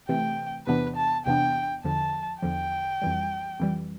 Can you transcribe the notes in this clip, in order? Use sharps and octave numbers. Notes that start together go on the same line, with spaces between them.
C3 E3 A3 C4 G5
E2 C3 E3 B3 D4 B4
A5
E2 C3 E3 B3 D4 G5
E2 D3 F3 A5
E2 D3 F3 G5
F2 E3 G3
F2 E3 G3